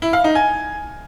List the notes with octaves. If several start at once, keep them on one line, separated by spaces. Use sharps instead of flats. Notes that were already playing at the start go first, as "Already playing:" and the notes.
E4
F5
D#4
G#5